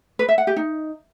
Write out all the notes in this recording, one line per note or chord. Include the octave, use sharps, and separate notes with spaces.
B4
E5
F#5
G4
D#4